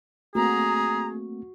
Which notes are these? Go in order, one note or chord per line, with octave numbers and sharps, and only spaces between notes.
A3 A#3 C4 F#4 G#4 A#5